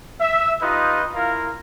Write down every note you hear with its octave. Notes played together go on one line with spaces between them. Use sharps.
E5
D#4 F4 G4 B4 D#5
E4 F4 A#4 F5